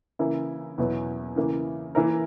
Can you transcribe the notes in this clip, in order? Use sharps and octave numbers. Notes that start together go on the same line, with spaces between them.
C#3 E3 A#3 E4 A#4
E2 B2 F#3 B3 E4
C#3 E3 A#3 E4
E3 A#3 E4 A#4